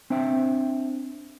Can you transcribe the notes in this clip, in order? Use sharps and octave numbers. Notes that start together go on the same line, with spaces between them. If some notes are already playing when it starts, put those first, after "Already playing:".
C4 D4 C5 E5 G5